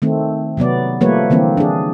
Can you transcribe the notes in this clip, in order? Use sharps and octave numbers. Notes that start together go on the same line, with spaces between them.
D#3 A3 C4
C3 F#3 B3 D5
F3 G3 A3 A#3 B4 C#5
D3 E3 A#3 C4
D4 G#4